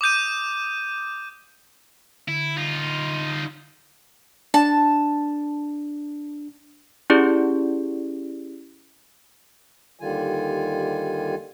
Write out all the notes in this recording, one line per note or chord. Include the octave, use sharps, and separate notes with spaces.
D6 D#6 G6 D#7
D3 E4
D#4 F4
D4 A5
C#4 E4 G4 G#4 D5
D#2 D3 D#3 G3 F4 G#5